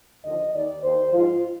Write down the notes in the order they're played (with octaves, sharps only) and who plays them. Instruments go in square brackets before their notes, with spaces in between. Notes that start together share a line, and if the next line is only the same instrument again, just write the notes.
[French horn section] D#2 D3 F3 D#5
D#2 D#3 D5
D#2 D#3 C5
G#2 F3 F4